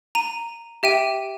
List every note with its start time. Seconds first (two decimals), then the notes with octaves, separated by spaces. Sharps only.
0.15 A#5 D#7
0.83 G4 E5 G5 D#7